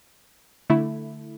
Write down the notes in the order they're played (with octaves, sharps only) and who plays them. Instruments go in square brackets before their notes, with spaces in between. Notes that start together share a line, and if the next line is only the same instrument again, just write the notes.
[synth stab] D3 A3 E4